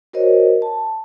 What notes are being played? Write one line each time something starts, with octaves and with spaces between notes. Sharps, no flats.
F#4 A#4 C5 C#5 D#5
A5